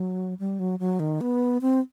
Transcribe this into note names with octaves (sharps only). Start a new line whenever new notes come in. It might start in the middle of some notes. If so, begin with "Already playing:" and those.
Already playing: F#3
G3
F#3
F#3
D#3
B3
C4